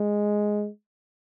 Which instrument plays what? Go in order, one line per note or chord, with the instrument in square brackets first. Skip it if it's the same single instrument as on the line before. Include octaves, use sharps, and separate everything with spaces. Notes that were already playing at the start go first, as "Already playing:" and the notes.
Already playing: [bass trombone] G#3